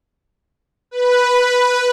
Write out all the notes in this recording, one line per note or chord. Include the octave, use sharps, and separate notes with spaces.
B4